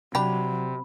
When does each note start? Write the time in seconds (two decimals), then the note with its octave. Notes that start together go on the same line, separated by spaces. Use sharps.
0.15 C3 F#3 D4 G4 B5